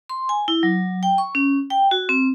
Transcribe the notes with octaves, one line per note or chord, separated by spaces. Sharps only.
C6
G#5
E4
F#3
G5
C#6
C#4
G5
F#4
C4